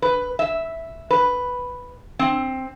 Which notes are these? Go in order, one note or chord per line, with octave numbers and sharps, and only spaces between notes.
B4
E5
B4
C4